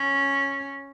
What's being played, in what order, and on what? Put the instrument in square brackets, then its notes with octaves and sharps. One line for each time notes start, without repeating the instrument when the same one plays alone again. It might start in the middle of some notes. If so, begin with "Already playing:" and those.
Already playing: [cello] C#4